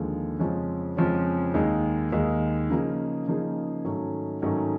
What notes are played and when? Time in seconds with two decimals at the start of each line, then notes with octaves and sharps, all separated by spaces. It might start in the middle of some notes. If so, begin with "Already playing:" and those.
Already playing: D#2 D3 F3 G#3
0.39 F2 C#3 F3 G#3 C#4
0.97 F2 C#3 F3 G#3 C#4
1.54 D#2 D#3 G#3
2.12 D#2 D#3 G#3
2.70 C#3 F3 A#3 D#4 G#4
3.27 C#3 F3 A#3 D#4 G#4
3.84 G#2 D#3 F#3 A3 C#4
4.42 G#2 D#3 F#3 A3 C#4